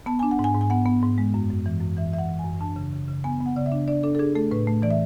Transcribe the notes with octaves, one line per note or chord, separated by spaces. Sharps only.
B3 A5
D4 G#5
F#5
G#2
G#5
G#2
G#5
B3 F#5
B3
G#2
G#3
F#2
F#2
E3
F#2
E3 E5
E3 E5
F#5
E3
G#5
F#2
D4 A5
C#3
C#3
C#3
B3 G#5
B3
F#5
C#3 D5
E5
D4
D4 D5
D4 A4
A4
D4 G#4
A3 A4
A2 B4
A3
E3 D5
E5